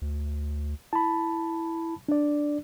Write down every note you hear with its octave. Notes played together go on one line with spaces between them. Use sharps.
D2
E4 A5 B5
D4 D5